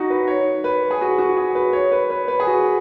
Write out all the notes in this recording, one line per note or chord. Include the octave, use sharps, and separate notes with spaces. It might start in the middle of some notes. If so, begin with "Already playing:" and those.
Already playing: D#4 F#4
B4
C#5
B4
G#4
F#4
F#4
G#4
B4
C#5
B4
B4
B4
G#4
F#4